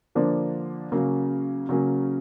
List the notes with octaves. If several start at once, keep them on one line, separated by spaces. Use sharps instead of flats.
D3 F3 A#3 D4
C#3 F#3 A#3 C#4
C#3 F#3 A#3 C#4